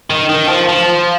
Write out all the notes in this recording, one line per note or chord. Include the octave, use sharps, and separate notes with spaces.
D#3
D#3
F3
F3